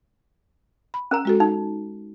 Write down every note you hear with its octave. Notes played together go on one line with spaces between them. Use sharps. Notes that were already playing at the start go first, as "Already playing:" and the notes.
B5
C#4 A#4 A#5
G#3 F#4 A4
D#4